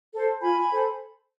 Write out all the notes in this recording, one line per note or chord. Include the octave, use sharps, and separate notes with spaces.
A4 C5
F4 G#5 B5
A4 C5